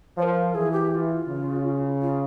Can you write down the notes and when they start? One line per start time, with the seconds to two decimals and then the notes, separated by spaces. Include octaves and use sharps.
0.18 F3 C#5
0.22 A#4
0.55 E3 G#4
0.73 G4
0.91 G4
0.95 F4
1.28 C#3
2.02 F4